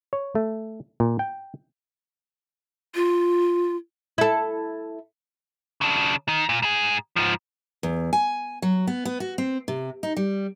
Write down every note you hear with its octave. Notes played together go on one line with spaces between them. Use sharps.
C#5
A3
A#2
G5
F4
E4 A4
C#3 D4
D#3
A#2
G#2 G#4
G#2 F3
E2
G#5
F#3
B3
B3
F#4
C4
C3
D#4
G3